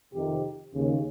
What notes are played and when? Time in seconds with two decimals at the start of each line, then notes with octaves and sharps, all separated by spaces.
0.14 F2 C3 D#3 G4
0.74 D#2 C#3